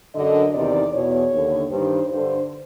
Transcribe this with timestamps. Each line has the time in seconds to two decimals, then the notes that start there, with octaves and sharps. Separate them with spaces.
0.15 F#2 D3 D#5
0.54 E2 C3 D#3 D5
0.93 E2 B2 C#5
1.32 D#2 D3
1.70 G2 D#3 C5
2.09 G2 D3 C5